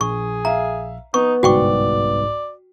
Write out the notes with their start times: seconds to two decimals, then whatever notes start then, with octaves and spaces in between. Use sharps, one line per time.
0.01 A#1 G#4 C#6
0.45 E5 F5 A#5
1.14 B3 D#4 C#6
1.43 G1 C2 G#2 F#4 D5 G5 C#6